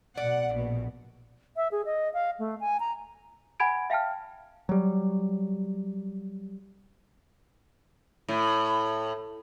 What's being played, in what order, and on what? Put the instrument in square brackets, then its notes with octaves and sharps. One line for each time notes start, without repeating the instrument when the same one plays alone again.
[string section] B2 F#5 [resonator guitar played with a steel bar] D5
[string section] A#1 B2
[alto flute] E5
G#4
D#5
F5
A3
G#5
A#5
[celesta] F#5 G#5 B5 G#6 D7
E5 F5 G5 A5 F6
[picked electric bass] F#3 G3
[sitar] A2